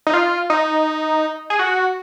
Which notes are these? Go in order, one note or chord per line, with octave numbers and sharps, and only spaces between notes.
D#4
F4
D#4
G#4
F#4